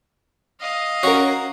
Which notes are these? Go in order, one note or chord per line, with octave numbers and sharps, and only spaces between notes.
D#5 F5
C#4 F#4 A#4